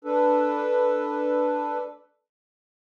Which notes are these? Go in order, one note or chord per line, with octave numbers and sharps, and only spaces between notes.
D4 A4 B4